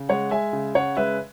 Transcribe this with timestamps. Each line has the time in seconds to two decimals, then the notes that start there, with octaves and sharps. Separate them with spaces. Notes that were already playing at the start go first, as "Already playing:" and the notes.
Already playing: C#3
0.09 G#3 C#5 F#5
0.31 G#3 E5 G#5
0.53 C#3
0.75 C#3 C#5 F#5
0.97 G#3 B4 E5